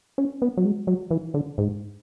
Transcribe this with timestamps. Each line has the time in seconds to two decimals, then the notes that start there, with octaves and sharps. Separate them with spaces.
0.18 C#4
0.42 B3
0.57 F#3
0.65 G#3
0.87 F#3
1.11 E3
1.34 D3
1.58 G#2